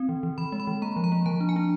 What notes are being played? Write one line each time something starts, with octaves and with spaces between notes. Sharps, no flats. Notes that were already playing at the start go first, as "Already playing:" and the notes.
Already playing: C4
E3
E3
E3 B5
G#3
B5
E3
A#3 A#5
F3
A#5
A#3
F3 A5
D4
G#5
D4